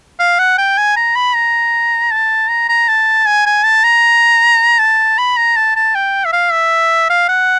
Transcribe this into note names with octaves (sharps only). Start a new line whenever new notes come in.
F5
F#5
G5
G#5
A#5
B5
A#5
A5
A#5
A#5
A5
G#5
G#5
A5
A#5
A5
B5
A#5
A5
A5
G5
E5
F5
E5
F5
F#5